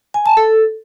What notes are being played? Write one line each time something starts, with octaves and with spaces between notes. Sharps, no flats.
G#5
A5
A4